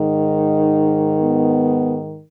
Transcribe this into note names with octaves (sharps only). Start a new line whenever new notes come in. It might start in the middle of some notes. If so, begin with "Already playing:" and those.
Already playing: G#2 D#3 D#4
B3